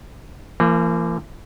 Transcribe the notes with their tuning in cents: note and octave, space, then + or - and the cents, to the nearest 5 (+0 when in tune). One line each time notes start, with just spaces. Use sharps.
E3 +45 A#3 -30